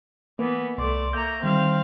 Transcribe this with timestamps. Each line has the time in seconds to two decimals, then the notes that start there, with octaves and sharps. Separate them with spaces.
0.39 E3 A#3 B3 B4
0.78 C2 A3 D5 C6
1.13 A#3 E5 A#5 C#6 G6
1.42 D3 D#3 G3 C4 F5